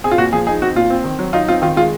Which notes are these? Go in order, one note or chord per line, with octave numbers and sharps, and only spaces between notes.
C4 G#4
F4
A#2 F#4
F3 G#4
D#4 G#4
C4 F#4
A#2 F4
C4
D#3
F#3
D#4 F4
C4 F4
D#3 F4
G#3 F4